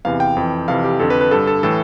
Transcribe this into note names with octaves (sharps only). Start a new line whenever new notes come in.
E2 C3 E3 F5
G5
F2 E3
F2 C3 E3 F5
G4
F2 D3 A4
B4
B4
G2 D3 A4
A4
A2 E3 A4